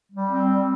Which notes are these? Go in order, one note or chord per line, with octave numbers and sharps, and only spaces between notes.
G3
C4
G3